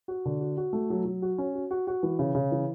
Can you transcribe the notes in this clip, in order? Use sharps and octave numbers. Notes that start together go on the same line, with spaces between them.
F#4
D3
F#4
F#4
A3
F#3
F#3
F#4
C#4
F#4
F#4
F#4
E3
C#3
C#3
E3